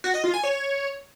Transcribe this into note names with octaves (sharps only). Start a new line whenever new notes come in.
F#4
D#5
F4
G#5
C#5